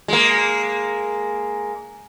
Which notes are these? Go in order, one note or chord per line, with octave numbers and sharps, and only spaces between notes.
G#3 A#3